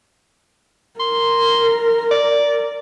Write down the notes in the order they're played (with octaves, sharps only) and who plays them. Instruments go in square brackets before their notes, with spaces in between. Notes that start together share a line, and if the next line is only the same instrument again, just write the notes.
[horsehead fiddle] A#4 [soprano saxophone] C6
[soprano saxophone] D5